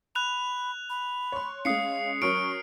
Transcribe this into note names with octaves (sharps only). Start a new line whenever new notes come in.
B5 F#6 F7
B5
C#5 C6
G#3 C#4 F5 D#6 C7 C#7
F#3 C#4 A#4 C#6 F6 D7